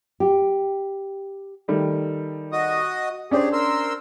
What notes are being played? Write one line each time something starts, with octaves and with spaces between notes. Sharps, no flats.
G4
D#3 G3 A3
F#4 D#5 D#6
C#4 D4 G4 G#4 C5
A#4 C6 E6